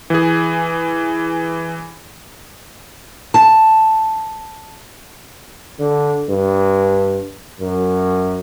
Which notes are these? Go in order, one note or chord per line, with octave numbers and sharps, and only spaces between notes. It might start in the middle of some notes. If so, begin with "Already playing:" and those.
E3 G#4
A5
D3
G2
F#2